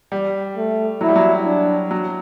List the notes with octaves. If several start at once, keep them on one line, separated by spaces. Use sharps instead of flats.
G3
A3
F#3 E4
G3
F#3
D4
F#3